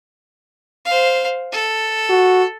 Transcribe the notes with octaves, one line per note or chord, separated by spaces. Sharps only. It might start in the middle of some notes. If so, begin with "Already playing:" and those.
C5 F5
A4
F#4